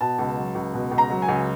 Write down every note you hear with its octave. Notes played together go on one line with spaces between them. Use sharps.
B2 A5
C#2
F#3
C#2
B2
C#2
A#5
F#3
G#5
C#2